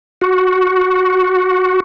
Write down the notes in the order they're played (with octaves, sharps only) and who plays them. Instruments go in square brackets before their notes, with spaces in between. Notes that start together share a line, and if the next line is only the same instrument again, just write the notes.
[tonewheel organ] F#4